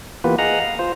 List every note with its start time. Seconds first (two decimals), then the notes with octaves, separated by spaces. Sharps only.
0.24 E3 A#3 B3 F4 G4 B4
0.39 G#4 D#5 F5 F#5 A#5
0.60 F5
0.79 F4 C5